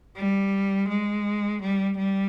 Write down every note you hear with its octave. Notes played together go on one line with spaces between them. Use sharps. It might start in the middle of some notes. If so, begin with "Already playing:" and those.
G3
G#3
G3
G3